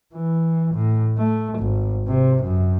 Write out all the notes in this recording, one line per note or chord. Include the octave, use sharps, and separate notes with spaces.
E3
A2
A3
G#1
C3
F#2